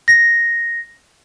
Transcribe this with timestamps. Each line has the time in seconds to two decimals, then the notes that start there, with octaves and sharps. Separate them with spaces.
0.08 A#6